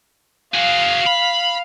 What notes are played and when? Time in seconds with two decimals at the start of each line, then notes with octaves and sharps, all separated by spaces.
0.54 F#4 G#4 F5
1.07 B5